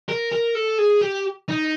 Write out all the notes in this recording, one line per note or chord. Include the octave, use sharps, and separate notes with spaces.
A#4
A#4
A4
G#4
G4
D#4